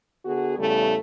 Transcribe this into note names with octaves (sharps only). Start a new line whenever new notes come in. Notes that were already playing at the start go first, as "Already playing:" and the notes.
D3 B3 F#4 G#4
E2 C#3 G3 A3